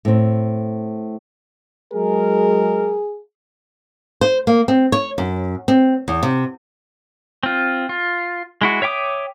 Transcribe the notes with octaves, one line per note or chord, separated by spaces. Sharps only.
A2 C4
F#3 G#3 G#4 A#4
C5
A#3
C4
C#5
F#2
C4
E2
C3
C4 F4
F4
G#3 E4 F#4
C#5 E5 G5 D6 D#6